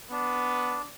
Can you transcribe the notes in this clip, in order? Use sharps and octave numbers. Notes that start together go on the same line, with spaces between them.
B3 D4